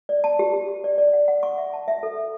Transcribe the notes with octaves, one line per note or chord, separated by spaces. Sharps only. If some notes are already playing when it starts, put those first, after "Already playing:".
D5
A5
G4
G4
G4
D5
D5
F#5
F#5
C#6
E5
A5
E5
A4
E5